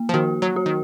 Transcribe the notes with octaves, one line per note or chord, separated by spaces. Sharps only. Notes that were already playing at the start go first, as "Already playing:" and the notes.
Already playing: A#3
F3
D#3 F#4
F#3
F#4
D#3